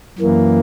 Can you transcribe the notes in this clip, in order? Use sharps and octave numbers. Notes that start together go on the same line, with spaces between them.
F#2 E3 A#3